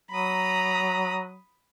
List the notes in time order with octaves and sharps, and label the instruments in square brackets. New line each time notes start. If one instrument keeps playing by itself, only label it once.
[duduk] F#3 [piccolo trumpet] A#5 [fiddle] B5 D#6